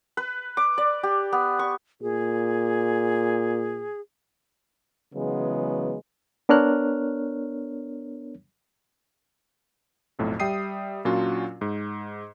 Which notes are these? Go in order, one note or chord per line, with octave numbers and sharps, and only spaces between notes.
B4
D6
D5
G4
B3
C#6
A#2 G#4
C#3 E3 F#3 G#3 B3
B3 D4 A#4 C#5 F6 F#6
B1 F2 A2
G3 E5 G5 D#6 C7 D#7
A#2 F#3 C#4 D4 F4 F#4
G#2